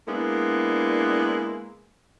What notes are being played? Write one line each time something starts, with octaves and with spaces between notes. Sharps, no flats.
G#3 A#3 B3 D4 E4